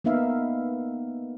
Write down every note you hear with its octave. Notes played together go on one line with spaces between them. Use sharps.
A#3 B3 D#4 E5 F5